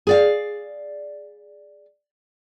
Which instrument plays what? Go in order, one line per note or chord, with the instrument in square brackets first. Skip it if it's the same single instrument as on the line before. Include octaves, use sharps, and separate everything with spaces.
[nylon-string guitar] G#4 D5 F5